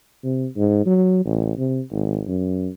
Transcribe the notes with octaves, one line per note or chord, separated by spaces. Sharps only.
C3
G#2
F#3
A1
C3
G#1
F#2